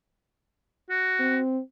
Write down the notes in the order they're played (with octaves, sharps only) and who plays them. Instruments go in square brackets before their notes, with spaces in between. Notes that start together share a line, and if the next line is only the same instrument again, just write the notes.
[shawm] F#4
[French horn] C4